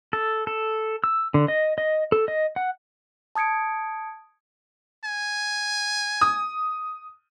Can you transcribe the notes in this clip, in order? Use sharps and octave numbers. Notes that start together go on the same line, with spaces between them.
A4
A4
E6
D3
D#5
D#5
A4
D#5
F#5
A5 D#6 G#6 C#7 D7
G#5
D#6